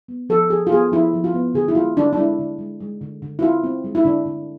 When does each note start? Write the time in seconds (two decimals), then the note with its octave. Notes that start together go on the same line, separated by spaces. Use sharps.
0.08 B3
0.29 F3 A4
0.50 F3 G#4
0.67 F4
0.72 B3 G#4
0.92 F3 E4
1.13 F3
1.24 F4
1.34 B3
1.54 D3 G#4
1.68 E4
1.75 G#3 F4
1.97 D3 D4
2.13 D4
2.17 G#3 E4
2.39 D3
2.59 G#3
2.80 G#3
3.01 D3
3.22 D3
3.39 E4
3.42 C4 F4
3.64 C4
3.84 G#3
3.95 E4
4.05 D3 D4
4.26 D3